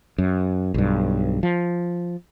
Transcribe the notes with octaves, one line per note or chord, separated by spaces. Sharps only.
F#2
B1 G2
F3